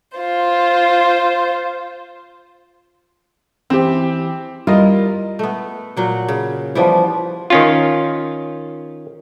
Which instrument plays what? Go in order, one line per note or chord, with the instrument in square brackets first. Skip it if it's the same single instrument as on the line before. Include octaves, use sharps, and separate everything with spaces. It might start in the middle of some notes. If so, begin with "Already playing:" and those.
[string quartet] F4 C5
[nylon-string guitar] E3 [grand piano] C4 G4
[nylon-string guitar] G3 E4 A#4 [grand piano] F4 D#5
[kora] A3 B3
A#2 F#3 F#5
C#3
[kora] E3 G3 B3 [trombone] F3
[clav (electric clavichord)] D#3 C#4 F4